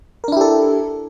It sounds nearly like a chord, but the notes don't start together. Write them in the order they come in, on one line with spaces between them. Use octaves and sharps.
A#4 D4 E4 G4 A4